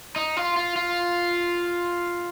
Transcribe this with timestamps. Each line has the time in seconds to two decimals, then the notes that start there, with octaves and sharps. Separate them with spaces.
0.16 D#4
0.37 F4
0.57 F4
0.76 F4